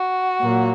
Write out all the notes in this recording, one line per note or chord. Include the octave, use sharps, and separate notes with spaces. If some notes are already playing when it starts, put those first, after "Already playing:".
Already playing: F#4
A#2 F#3 A#3